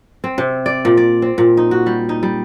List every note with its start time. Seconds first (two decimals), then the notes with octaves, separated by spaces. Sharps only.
0.24 C4
0.38 C3
0.66 D5
0.85 A#2
0.97 D5
1.22 C4
1.38 A#2
1.57 D#4
1.71 F#4
1.86 G3
2.09 D#4
2.23 G3